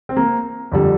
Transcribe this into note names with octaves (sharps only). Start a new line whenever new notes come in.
C4
A#3
F2 D3 G3